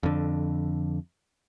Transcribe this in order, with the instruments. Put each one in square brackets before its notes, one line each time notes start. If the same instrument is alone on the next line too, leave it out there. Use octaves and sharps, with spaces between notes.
[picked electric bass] F2 D3